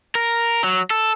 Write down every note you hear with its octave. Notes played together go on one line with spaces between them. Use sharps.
A#4
F#3
A4